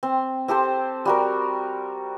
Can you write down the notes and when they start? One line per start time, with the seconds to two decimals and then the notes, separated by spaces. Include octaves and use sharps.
0.03 C4
0.48 C4 G4 A4 C5
1.05 G3 F#4 A#4